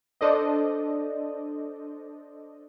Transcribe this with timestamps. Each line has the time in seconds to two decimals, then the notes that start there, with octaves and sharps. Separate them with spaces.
0.21 D4 A4 C5 D5 D#5